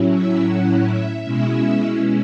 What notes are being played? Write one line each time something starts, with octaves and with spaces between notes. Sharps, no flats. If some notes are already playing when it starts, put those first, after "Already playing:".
Already playing: A2 F#3 C#4 E4
E5
F#5
E5
B2 G#3 C#4 E4